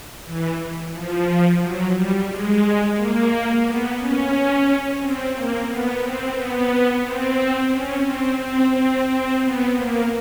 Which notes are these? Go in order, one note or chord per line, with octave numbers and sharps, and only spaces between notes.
E3
F3
F#3
G3
G#3
A#3
B3
C#4
C4
A#3
B3
C4
B3
C4
C#4
C4
C4
C4
C4
B3
A#3